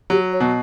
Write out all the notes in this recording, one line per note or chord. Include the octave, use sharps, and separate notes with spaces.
F#3 G4
C#5
B2